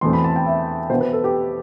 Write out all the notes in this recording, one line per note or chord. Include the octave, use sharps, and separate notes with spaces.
E2 B2 A3 C4 C6
B5
A5
G5
E5
B2 B3 C5
B4
A4
G4